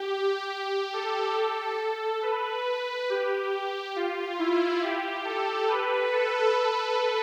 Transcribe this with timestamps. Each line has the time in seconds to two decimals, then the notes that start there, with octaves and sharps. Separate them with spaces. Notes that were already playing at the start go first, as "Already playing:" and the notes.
Already playing: G4
0.50 G4
0.94 A4
2.22 B4
2.66 B4
3.10 G4
3.96 F4
4.39 E4
4.82 G4
5.25 A4
5.68 B4
6.12 A4